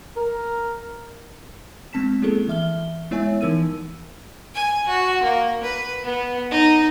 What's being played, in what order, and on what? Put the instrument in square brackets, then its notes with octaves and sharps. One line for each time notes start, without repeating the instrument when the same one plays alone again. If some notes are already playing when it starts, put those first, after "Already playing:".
[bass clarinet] A#4
[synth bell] G#3 B3 C4 A5 B6 E7
G#3 A#3 E4 G#4 A4
E3 E5 F6 G7
G#3 B3 E4 C#5 E5 G#5
E3 D#4 A#4 E6 D#7
[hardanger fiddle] G#5
F#4
A#3
B4
B3
D#4